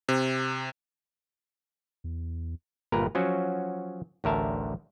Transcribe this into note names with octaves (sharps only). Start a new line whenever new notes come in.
C3
E2
G1 A#2 A#4 B4 A#5
F3 F#3 C#4 F#4
A1 D2 A#4 E5 A5